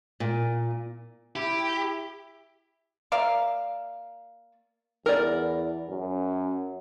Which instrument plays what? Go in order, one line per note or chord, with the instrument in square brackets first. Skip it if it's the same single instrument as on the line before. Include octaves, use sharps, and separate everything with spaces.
[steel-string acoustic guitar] A#2
[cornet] E4 [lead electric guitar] G4
[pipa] A#3 D5 E5 F5
[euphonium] E2 [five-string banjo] A#4 D5
[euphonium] F#2